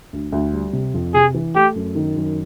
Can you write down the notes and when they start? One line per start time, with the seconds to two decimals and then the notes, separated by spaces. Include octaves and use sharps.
0.13 D2
0.32 D2
0.53 G3
0.73 C3
0.94 F2
1.14 C3 G#4
1.34 E3
1.55 A3 G4
1.75 F#2
1.95 D#3
2.16 F#2